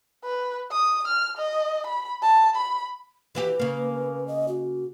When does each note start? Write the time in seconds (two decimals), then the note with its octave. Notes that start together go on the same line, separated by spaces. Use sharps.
0.24 B4
0.71 D#6
1.07 F6
1.37 D#5
1.87 B5
2.22 A5
2.56 B5
3.35 E3 F#4 G4 B4
3.59 C#3 A#3
4.28 D#5
4.48 F#4